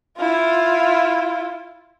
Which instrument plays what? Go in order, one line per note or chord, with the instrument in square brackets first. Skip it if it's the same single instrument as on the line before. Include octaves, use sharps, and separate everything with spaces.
[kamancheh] E4 F4